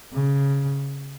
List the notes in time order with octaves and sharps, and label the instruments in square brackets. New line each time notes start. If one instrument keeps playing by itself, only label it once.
[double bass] C#3